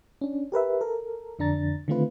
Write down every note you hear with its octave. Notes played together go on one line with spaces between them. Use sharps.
C#4 D4
G4 A#4 B4 E5
A4 A#4
F2 D3 D4 A#5 A6
D3 D#3 A3 C4 F4 B4